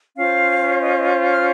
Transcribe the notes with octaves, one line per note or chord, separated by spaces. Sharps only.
C#4 F4 C5 F5
D#5
D#5
F6